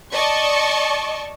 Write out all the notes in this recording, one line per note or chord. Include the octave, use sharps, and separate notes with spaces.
D5 D#5 A5 C#6